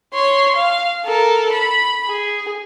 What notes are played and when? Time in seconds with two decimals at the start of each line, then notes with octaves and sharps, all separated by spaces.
0.14 C#5 C6
0.56 F5
1.05 A4 A#4
1.53 B5
2.07 G#4